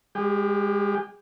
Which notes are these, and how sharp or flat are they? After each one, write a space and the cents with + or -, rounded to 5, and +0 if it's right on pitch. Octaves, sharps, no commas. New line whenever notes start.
G#3 -30 G4 +0